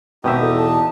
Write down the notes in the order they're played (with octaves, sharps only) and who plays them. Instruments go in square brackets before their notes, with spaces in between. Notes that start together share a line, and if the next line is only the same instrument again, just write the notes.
[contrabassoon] G#1 [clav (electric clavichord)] B2 E5 [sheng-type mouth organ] D#4 G4 D#5 [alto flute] G5
[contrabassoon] E2 [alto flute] A4
[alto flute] A5